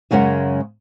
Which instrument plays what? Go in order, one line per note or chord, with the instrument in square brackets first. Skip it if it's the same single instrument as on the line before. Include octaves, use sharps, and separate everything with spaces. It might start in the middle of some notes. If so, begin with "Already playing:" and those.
[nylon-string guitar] F#2 C#3 G#3 C#4 A#4 F#5